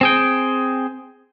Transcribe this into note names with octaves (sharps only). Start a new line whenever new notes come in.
C4 G#4 G5